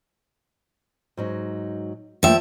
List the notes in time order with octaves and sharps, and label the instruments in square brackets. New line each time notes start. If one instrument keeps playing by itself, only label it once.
[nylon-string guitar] G#2 F#3 D#4
[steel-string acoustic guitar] F3 E5 [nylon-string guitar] A3 A#3 G5